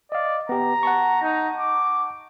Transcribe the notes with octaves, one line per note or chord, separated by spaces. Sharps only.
D5 D#5 F5
B3 G4 A#5
F#5 A5 C#6
D#4
D6